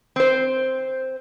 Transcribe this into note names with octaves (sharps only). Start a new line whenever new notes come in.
C4 C5